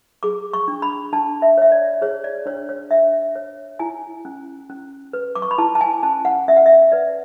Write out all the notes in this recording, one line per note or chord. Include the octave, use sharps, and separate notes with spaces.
G#4 D6
C#6
D4
B5
D4 A5
E5
C#5 E5
D5
G#4 C#5
D5
D4 C#5
C#5
D4 E5
C#5
E4 G#5
C#4
C#4
B4
D6
C#6
B5
E4 A5
A5
G#5
C#4 A5
F#5
C#4 E5
F#5
E5
B4 D5